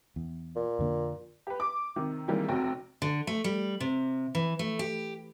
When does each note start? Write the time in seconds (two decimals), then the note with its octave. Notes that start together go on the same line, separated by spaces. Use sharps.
0.16 E2
0.56 A#2
0.79 F2 D3 A#3
1.47 G4 B4
1.60 D6
1.96 C3 D#3
2.28 C3 D#3 E3 G3 G#3 A#3
2.48 F1 C3 F#4 G5
3.02 D3
3.27 A3
3.44 G3
3.80 C3
4.35 E3
4.59 A3
4.79 G4